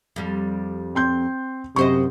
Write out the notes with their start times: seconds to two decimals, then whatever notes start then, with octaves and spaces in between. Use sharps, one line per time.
0.16 F2 G3
0.95 C4 C6 G6
1.76 F#2 C3 C5 D#5 C#6